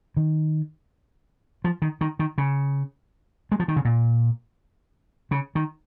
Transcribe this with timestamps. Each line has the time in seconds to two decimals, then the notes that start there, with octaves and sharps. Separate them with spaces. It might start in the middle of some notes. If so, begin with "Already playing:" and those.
0.17 D#3
1.64 F3
1.82 D#3
2.01 D#3
2.19 D#3
2.38 C#3
3.52 G#3
3.60 F3
3.68 D#3
3.76 C#3
3.85 A#2
5.31 C#3
5.55 D#3